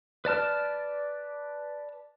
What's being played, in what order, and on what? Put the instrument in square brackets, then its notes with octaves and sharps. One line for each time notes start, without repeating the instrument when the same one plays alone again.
[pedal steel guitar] B4 D5 A5 F6